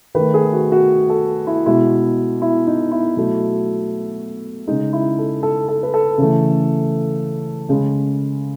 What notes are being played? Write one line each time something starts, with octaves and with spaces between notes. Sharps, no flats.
D#3 A3 B4
G#4
F#4
F#4
A4
E4
B2 G#3 E4
E4
D#4
E4
B2 F#3 A3
C#3 G#3 D#4
E4
A4
A4
A4
B4
A4
C#3 E3 A3
C#3 G#3